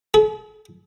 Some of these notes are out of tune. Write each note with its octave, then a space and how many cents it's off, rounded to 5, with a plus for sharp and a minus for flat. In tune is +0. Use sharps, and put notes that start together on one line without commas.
A4 -45